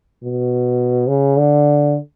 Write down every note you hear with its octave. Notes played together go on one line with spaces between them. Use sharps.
B2
C#3
D3